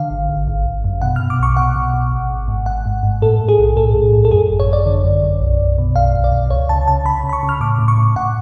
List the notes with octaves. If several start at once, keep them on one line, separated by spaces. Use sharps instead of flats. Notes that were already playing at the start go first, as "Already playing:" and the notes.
Already playing: D3 F5
G#1
G#1
G#1
G#1
F#2
B2 F#5
B2 F6
D6
B1 C#6
B2 F#5
B2
B2
G#1
G#1
G#2
G#2 F#5
G#2
G#2
A2 A4
A2
G#4
B1
A2 A4
A2
A2
A4
F#2 G#4
G#1
C#5
F#2 D5
D3
F#2
F#2
B1
B1
B2
B1 F5
B1
D5
B1
C#2 C#5
C#3 A5
C#3 A5
C#3 B5
C#3
B5
C#6
C#3
F6
A2 D6
A2
C#6
A2
A2 F#5